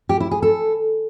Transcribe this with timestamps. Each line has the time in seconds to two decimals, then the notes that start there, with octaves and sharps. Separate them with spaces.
0.09 G4
0.20 E4
0.31 G#4
0.42 A4